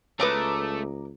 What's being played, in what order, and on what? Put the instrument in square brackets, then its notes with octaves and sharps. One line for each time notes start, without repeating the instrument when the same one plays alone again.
[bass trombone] C#2 [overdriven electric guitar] A3 [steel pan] B4 C#5 [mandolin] A#5 D6 D#6